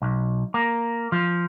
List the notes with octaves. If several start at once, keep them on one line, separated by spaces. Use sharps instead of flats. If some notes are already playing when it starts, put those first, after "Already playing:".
B1
A#3
F3